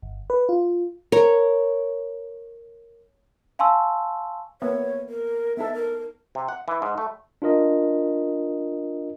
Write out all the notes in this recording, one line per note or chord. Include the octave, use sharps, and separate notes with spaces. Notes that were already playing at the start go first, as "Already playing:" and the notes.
G1
B4
F4
A#4 C#5
F5 G#5 A5 C6 C#6 E6
A#3 B3 C#5 E5
A#4
B3 D#4 A4 E5
A#4
C3
F#5
E3
G#2
A3
D4 F4 A#4 D#5